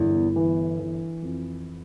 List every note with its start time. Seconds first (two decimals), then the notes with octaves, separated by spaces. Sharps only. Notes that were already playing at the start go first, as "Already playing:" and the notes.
Already playing: G1 E2 B3
0.36 E3
0.79 E3
1.22 F2